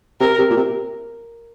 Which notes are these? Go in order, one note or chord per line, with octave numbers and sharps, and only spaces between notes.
C3 A#4
C3
A#2
C3